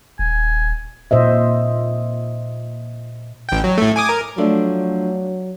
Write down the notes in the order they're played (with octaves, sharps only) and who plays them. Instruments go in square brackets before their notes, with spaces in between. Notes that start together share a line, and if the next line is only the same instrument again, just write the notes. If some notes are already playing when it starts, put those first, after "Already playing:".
[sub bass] D#1 [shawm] G#5
[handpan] A#2 C5 D#5 E5
[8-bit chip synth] A1 G5
F#3
A2 A3
G#5 D6 D#6
A#4
[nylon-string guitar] F3 A3 D4 [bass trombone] F#3